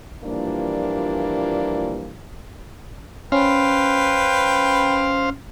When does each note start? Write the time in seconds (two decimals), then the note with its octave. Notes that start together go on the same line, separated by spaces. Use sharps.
0.24 A#2 E3 F3 G3 A#3 D4
3.32 C#4 B4 C5 F5 G5